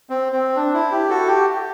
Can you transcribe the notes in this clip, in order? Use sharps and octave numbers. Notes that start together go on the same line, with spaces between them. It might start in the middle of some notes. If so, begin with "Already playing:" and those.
C4
C4
D4
E4
G4
F#4 A4
G4